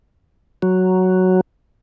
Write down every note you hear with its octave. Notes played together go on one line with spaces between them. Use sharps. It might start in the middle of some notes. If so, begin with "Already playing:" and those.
F#3